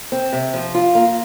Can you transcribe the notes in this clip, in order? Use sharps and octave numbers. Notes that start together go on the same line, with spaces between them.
C4
C3
F3
F4
A#3